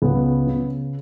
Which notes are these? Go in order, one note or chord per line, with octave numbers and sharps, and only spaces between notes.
C#2 B3
C#3